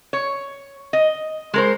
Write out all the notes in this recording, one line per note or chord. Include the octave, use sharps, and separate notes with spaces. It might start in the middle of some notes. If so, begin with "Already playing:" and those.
C#5
D#5
G#3 A#4 C5